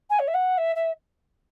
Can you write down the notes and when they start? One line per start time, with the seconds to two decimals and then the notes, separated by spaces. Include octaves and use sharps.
0.10 G#5
0.19 C#5
0.27 E5
0.34 F#5
0.57 E5
0.75 E5